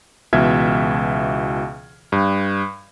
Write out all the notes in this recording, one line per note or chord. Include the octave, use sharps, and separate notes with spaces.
C#2 B2 E3 E5 F6 G#6
G2